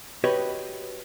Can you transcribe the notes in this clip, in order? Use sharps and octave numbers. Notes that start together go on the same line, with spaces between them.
F#4 G4 B4 C#5 D#5